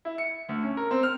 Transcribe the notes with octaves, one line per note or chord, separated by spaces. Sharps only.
E4
C#7
D2
C#4
A#4
C4
F6